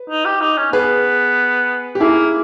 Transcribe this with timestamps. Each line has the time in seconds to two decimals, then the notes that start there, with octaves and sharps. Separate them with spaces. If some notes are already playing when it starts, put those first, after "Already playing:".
Already playing: B4
0.10 D#4
0.25 G4
0.41 D#4
0.57 C#4
0.72 B3 G#4 B4
1.95 G4
2.00 A#3 E4 G#4